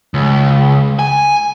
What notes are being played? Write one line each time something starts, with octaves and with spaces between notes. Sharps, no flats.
C#2
G#5